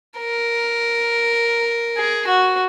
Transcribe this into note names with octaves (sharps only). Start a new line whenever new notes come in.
A#4
G#4
F#4